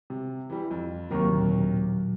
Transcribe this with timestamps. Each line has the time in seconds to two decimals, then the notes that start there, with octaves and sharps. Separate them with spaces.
0.10 C3
0.50 E3 G3
0.71 F2
1.11 D#2 C3 F#3 A#3 A#4 C#6
1.32 A#2 D3 F#3